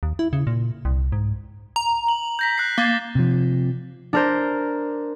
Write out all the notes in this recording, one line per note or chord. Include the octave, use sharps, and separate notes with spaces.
D#2
E4
C#3
A#2
C2
G#2
A#5
F#7
G6 A#6 B6
F#6 C7
A#3 D6 A6 G7
C3 F3
D4 A#4 C5